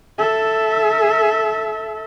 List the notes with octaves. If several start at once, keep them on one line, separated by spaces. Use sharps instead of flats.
A4 E5